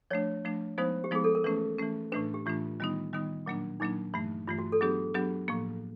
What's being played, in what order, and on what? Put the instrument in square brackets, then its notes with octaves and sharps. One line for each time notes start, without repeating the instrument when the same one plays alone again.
[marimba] F3 A3 D4 [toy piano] C#5
[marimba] F3 A3 D4
[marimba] F3 G#3 B3 D#4 [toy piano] C5
[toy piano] G4
[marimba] F3 G#3 B3 D#4 [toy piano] G#4
[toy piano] A4
A#4
[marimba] E3 A3 C#4 [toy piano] B4
[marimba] E3 A3 C#4
[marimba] A2 E3 A3 D4 [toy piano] B4
[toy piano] G4
[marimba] A2 E3 A3 D4 [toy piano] F4
[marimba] D#3 G3 B3 D#4
D#3 G3 B3 D#4
A#2 F#3 A#3 D4
[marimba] A#2 F#3 A#3 D4 [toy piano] D#4
[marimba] G2 E3 A3
[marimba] G2 E3 A3 [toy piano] F4
[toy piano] F#4
A4
[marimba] F#3 B3 D4 G4 [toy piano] G#4
[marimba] F#3 B3 D4 G4
A2 F3 A#3